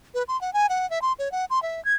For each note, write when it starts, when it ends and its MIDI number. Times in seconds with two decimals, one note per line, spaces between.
0.14 0.23 71
0.28 0.39 84
0.41 0.53 78
0.53 0.67 80
0.69 0.89 78
0.90 1.02 76
1.02 1.13 84
1.19 1.31 73
1.32 1.45 78
1.50 1.62 84
1.62 1.83 76
1.85 1.95 92